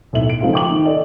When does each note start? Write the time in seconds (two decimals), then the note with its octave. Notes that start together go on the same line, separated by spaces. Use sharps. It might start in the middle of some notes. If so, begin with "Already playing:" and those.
0.13 B1 A2 E5 F#7
0.30 D7
0.41 C#3 F3 G#3 A3 D#4 F4
0.53 G5 D6 F#7
0.70 D#3
0.85 A4 D5 D#5